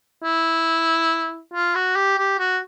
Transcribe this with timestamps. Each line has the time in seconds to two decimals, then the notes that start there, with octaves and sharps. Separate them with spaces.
0.23 E4
1.53 F4
1.75 F#4
1.95 G4
2.18 G4
2.39 F#4